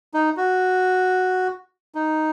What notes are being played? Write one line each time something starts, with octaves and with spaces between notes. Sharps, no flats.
D#4
F#4
D#4